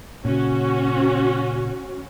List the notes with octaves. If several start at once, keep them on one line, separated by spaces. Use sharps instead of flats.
A#2 C#3 C#4 F#4